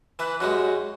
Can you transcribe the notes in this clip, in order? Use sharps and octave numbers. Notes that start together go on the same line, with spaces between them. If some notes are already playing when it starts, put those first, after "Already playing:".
E3 B4
F#2 G3 G#3 F#4